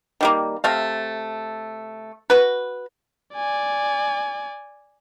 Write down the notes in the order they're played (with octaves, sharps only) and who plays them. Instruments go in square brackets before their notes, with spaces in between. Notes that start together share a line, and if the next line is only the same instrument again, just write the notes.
[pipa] D#3 G3 A#3
C3 A3 F5
F#4 B4
[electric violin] D5 G#5